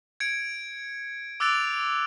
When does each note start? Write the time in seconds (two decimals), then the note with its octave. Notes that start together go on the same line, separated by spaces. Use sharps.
0.20 G#6 C#7 D7
1.40 D6 E6 F#6 A6 D7 F7